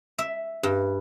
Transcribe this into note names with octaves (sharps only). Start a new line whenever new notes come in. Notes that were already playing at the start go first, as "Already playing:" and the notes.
E5
G2